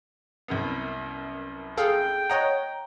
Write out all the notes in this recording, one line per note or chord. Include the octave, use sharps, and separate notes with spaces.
C2 F#2 B3
G#4 A4 F5 G5
C#5 D#5 F#5 A#5